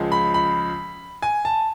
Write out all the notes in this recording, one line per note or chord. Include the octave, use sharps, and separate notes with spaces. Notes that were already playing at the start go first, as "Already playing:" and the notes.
Already playing: C#2 C#3 F3 G#3
B5
B5
G#5
A5